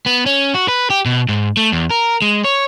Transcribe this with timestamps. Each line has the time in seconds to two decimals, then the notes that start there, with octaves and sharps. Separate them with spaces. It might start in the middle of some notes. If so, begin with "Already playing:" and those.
0.06 B3
0.26 C#4
0.55 F#4
0.68 B4
0.90 G4
1.06 B2
1.29 G#2
1.57 A3
1.72 E2
1.91 A#4
2.22 G#3
2.44 C#5